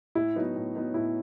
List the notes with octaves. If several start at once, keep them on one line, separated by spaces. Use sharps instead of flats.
A2 E4
F#3 B3 D#4
A2
F#3 B3 D#4
A2 E4